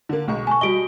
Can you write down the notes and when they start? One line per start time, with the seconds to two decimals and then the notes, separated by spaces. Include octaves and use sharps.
0.09 D3 A#3
0.28 B1 G#3 C#6
0.47 G#5 A5 C#6
0.61 G3 F#4 D#5 D7 G7